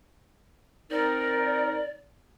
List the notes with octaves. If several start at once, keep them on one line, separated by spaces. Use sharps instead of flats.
C4 D#4 A#4 D5